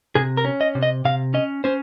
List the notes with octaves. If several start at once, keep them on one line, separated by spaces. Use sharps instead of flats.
C3 G#4
A#4
C#4
D#5
C3
D#5
C3 F5
C#4 D#5
C#4 C5